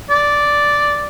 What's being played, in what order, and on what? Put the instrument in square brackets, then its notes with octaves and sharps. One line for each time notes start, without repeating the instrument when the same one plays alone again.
[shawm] D5